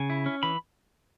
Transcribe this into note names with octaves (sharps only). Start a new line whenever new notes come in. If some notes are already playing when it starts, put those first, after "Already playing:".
Already playing: C#3 G#5
E4
C#4
E3 B5